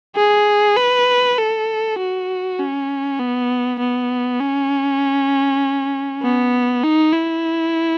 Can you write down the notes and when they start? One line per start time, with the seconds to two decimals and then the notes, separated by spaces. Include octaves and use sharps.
0.16 G#4
0.76 B4
1.38 A4
1.99 F#4
2.59 C#4
3.19 B3
3.79 B3
4.40 C#4
6.23 B3
6.84 D#4
7.13 E4